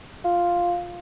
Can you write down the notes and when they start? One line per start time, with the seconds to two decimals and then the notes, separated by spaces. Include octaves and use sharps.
0.24 F4